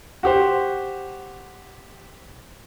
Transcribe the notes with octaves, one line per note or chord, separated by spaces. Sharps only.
F#4 G4 C5